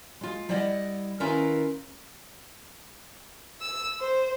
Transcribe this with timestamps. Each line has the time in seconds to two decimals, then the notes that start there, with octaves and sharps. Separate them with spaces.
0.21 G#3 F4
0.49 G3 E4 D5 D#5 F#5
1.20 D#3 C#4 E4 F4 A#4 B4
3.60 E6
4.01 C5